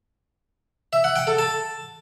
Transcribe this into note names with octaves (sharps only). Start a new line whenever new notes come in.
E5
F#5
G5
A4
A5